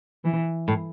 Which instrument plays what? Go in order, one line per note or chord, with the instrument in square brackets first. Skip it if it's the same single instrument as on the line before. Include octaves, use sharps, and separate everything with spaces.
[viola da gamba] E3
[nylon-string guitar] A2